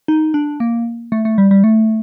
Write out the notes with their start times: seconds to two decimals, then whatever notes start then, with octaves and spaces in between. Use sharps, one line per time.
0.08 D#4
0.34 D4
0.60 A#3
1.12 A3
1.25 A3
1.38 G3
1.51 G3
1.64 A3